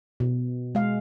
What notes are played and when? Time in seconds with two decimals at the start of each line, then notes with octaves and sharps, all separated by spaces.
0.20 B2
0.75 G#3 F5